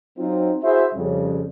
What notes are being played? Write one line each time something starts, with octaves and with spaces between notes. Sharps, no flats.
F#3 C4 D#4 F4
E4 F#4 G#4 C5 E5
F2 C#3 G3